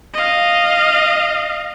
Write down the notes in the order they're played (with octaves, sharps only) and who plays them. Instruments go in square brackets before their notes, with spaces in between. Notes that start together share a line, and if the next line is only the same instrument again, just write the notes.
[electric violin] D#5 F5